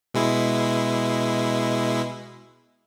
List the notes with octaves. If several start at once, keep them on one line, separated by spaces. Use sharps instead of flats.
B2 G#3 E4